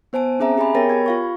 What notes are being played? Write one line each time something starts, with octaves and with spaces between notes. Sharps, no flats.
B3 C5 G#5 A5 D7
C4 C#4 G#4 E5 A#5
G4 G#4 D#5 G#5 B5
B3 A#4 C#5 G5 A6 A#6
G4 B5 G#6
F4 F5 C#6